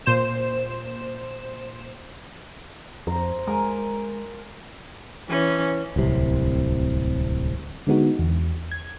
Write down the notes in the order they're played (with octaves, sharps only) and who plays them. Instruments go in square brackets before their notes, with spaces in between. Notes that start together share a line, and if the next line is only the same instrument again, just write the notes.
[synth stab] A#2 C5 E7
[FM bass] F2 [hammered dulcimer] C5 A#5
[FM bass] G#3 [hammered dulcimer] A#4 G#5
[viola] E3 C#4
[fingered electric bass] D1 C2 C3
[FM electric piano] D3 G#3 B3 D#4 F#4
E2
G#6